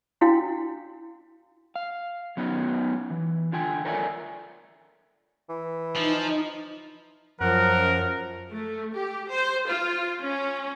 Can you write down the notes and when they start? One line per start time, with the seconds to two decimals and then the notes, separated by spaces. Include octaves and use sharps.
0.21 C#4 D4 E4 F#4 F5 G5
1.76 F5
2.37 F#3 B3 C#4 D#4 F#4
3.10 E3
3.52 D3 F4 G5 G#5
3.85 A4 A#4 C#5 D5 E5 G#5
5.49 E3
5.96 F3 D#4
7.41 F#2 F3 A#4 F#5
8.51 A3
8.95 G4
9.31 C5
9.67 F4
10.21 C#4